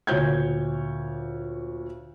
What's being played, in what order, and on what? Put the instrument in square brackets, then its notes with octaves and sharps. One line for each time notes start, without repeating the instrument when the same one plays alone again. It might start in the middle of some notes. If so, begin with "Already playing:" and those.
[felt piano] D2 A#2 C#5 G6 G#6